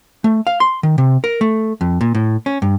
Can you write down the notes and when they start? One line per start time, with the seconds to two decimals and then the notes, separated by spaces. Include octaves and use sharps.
0.24 A3
0.47 F5
0.60 C6
0.83 D#3
0.98 C3
1.24 A#4
1.41 A3
1.81 F2
2.01 A#2
2.15 A2
2.46 C#4
2.62 G2